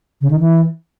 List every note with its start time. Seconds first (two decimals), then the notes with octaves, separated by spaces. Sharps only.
0.21 C#3
0.31 D#3
0.40 E3